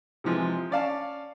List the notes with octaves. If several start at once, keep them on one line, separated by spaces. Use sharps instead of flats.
C3 E3 F3 G#3
C#4 D5 F5 A5